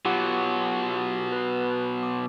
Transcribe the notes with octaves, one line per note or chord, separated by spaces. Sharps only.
B2 F#3 F4 G4 F#5
B4 B5
D6